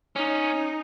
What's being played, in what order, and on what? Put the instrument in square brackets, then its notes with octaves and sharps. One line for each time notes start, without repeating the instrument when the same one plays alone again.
[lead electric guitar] C#4 [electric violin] D#4